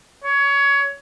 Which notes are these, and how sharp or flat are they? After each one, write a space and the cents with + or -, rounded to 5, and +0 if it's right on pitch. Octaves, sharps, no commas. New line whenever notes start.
C#5 +20